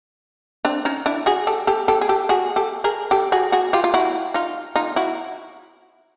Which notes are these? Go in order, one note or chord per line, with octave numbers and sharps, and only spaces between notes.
C4 D4
C#4 D#4
D4 E4
F#4 G#4
G4 A4
G4 A4
G4 A4
G#4
G4 A4
F#4 G#4
G4 A4
G#4 A#4
G4 A4
F#4 G#4
F#4 G#4
F4 G4
F4
E4 F#4
D#4 F4
D#4 F4
E4 F#4